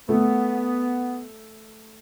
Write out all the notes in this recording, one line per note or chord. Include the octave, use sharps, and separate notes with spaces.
A3 B3